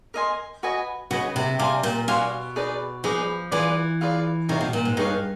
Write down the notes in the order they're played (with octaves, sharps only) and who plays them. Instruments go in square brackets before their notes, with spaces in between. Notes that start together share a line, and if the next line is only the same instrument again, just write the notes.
[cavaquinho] A#4 D#5 G#5 C6
F#4 B4 D#5 G#5
[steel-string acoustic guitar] C#3 [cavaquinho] F#4 B4 D#5 G#5
[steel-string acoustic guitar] C3
[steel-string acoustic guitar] C3 [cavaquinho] D5 F5 G#5 C6
[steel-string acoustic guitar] A#2
[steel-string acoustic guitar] B2 [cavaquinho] D5 F5 G#5 C6
[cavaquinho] D#4 G#4 B4 D5
[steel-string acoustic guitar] F3 [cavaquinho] D#4 G#4 B4 D5
[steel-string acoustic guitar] E3 [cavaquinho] F4 G#4 B4 D5
[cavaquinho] F4 G#4 B4 D5
[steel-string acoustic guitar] C3 [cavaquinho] D#4 G#4 C#5 F5
[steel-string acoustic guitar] B2
A#2
G#2
[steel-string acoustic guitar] G2 [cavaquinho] D#4 G#4 C#5 F5